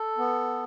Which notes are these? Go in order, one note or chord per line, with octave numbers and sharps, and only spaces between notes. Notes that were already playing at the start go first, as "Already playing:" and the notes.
Already playing: A4
B3